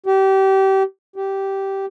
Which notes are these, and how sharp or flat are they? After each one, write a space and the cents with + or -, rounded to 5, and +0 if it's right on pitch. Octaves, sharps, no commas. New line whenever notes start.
G4 -25
G4 -10